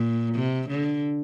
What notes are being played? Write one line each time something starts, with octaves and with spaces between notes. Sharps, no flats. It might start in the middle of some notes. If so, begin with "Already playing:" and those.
Already playing: A#2
C3
D3